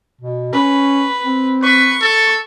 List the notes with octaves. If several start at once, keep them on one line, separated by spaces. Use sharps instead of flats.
B2
C#4 B4
C4
B4 C#6
A4